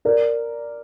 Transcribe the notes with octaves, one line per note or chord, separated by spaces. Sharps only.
A#4 D5